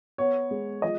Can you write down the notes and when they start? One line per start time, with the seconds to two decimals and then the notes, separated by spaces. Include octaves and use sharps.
0.18 B3 C#5
0.51 G#3
0.82 F3 D#5